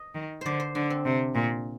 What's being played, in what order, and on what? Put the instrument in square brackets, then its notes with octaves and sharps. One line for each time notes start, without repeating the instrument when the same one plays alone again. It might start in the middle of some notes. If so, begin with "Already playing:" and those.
Already playing: [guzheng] D#5
[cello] D#3
[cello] D3 [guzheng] C5 D5
[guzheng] C5
[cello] D3 [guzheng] D4
[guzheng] C4
[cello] C3
A#2